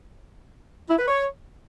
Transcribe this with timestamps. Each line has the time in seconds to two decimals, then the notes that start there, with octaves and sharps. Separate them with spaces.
0.89 E4
0.99 B4
1.08 C#5